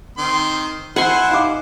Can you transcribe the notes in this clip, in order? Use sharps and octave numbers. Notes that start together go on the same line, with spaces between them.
D#3 C4 C6
E4 C5 F#5 G#5 C6
D#4 F5 D6